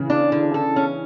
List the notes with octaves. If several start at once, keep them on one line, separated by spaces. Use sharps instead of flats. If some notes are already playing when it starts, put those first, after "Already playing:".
Already playing: C#3 E3
D4
D3
A4
C#4